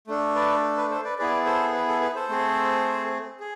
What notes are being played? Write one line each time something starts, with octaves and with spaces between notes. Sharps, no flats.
A3 D4 A4
B4 D5
B4
A4 C5
B4 D5
B3 E4 G#4 B4 D5
A4 C5
B4
A4
B4
A4 C5
A3 C4 G#4
G#4